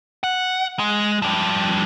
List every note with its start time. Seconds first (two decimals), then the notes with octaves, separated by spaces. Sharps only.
0.24 F#5
0.79 G#3
1.22 F3 G3